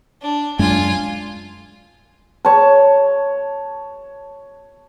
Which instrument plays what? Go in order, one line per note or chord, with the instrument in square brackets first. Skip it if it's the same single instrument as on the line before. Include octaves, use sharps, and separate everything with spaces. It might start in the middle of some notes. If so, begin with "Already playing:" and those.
[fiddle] D4
[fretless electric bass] F#2 G#3 D4 [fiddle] F4 G#5
[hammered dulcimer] C#5 A5